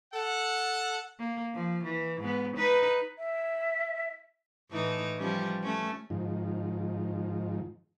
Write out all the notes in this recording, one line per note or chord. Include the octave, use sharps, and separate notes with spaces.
A4 F#5
A#3
F3
E3
G#2 B3
D#4 B4
E5
A2 E3 D#4
F3 G3 C#4
A3 C#4
G#2 D#3 F3